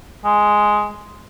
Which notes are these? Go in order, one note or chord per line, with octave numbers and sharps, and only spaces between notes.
G#3